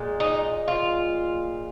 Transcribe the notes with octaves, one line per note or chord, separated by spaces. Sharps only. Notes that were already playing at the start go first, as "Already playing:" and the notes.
Already playing: A#2 G#3
D#4
F4